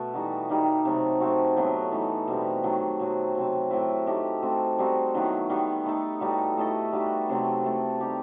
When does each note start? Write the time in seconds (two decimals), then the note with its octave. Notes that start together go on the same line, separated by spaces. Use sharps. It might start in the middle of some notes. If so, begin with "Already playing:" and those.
Already playing: B2 A3 B3 A4
0.14 E3 G3 D#4 F#4
0.49 D#3 G3 D#4
0.85 C3 F#3 A3
1.20 A3 C4 F#4
1.57 A2 F#3 B3 E4
1.92 E3 A3 D#4
2.28 B2 G3 C4
2.64 D#3 F#3 A3
3.00 B2 F#3 C4
3.35 C3 F#3 C4
3.70 A2 F#3 C4 E4
4.07 A3 D#4 G4 D#5
4.42 A3 C4 F#4
4.78 G3 C4 D#4 F#4
5.15 D#3 F#3 B3 E4
5.49 D#3 G3 B3
5.86 A3 D#4 A4
6.21 A2 G3 D#4 F#4
6.57 A3 E4 A4 D#5
6.93 G3 D#4 F#4 B4
7.29 C3 F#3 A3 C4
7.64 A3 E4 A4
8.00 G3 D#4 G4